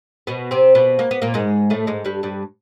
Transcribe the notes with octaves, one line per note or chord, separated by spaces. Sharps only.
B2 B3
C3 C4
B2 B3
A#3
B3
A#2 A#3
G#2 G#3
A2 A3
G#2 G#3
G2 G3
G2 G3